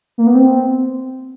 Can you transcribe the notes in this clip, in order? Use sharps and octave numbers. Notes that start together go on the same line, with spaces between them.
A#3
B3
C4